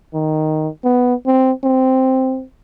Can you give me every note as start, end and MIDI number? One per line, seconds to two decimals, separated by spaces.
0.14 0.68 51
0.84 1.14 59
1.26 1.52 60
1.64 2.43 60